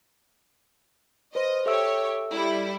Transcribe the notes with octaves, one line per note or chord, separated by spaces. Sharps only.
B4 C5 D#5
G4 A4 C#5 E5 E6
G3 E4